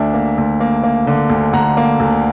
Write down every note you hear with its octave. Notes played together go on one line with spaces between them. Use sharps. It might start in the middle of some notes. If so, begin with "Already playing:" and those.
Already playing: D2 D4 E5
A#3
D2
A#3
A#3
D3
D2
D2 F#5 A#5
A#3
D2